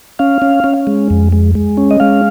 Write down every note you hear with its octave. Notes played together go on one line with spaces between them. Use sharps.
C#4 F5
C#4
C#4
G#3
F2
G#3
G#3
C#4
D#5
G#3 F5